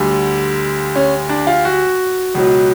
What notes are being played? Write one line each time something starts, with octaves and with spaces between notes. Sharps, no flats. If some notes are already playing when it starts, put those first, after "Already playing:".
Already playing: D2 D3 G3
C#4
D4
F4
F#4
C#2 B2 F#3